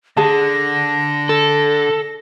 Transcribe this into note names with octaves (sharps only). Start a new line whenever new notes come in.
D3 G#4 A5 A#6
A4